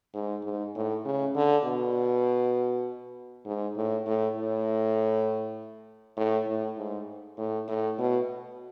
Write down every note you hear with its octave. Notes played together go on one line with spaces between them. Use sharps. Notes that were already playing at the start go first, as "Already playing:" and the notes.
G#2
G#2
A2
C#3
D3
B2
G#2
A2
A2
A2
A2
A2
G#2
A2
A2
B2